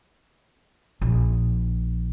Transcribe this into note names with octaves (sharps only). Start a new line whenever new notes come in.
A#1